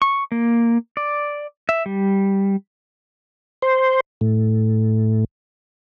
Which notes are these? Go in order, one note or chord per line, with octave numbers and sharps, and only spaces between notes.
C#6
A#3
D5
E5
G3
C5
A2